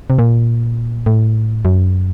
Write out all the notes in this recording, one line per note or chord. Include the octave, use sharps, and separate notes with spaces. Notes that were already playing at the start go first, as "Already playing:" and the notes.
C3
A#2
A2
F#2